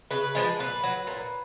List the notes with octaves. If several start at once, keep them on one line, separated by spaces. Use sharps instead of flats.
C#3 B4
F3 G#3 B4
A#2 B4
F#3
A#2